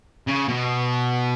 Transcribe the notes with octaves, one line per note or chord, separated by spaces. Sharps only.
C#3
B2